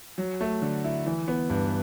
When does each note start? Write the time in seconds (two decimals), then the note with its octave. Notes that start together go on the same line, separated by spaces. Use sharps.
0.18 F#3
0.41 A3
0.62 D3
0.84 E4
1.06 E3
1.28 B3
1.50 G2